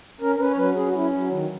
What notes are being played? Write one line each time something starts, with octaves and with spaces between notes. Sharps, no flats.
C#4 A#4
A#4
C#4 B4
C#5
F#3 B4
C#4 G#4
F#4
C#4 E4
F#3
D#3